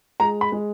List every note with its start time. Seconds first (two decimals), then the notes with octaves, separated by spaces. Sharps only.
0.20 G#3 A#5
0.41 B5
0.52 G#3